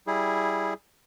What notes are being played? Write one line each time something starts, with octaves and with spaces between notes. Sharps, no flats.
G3 E4 G#4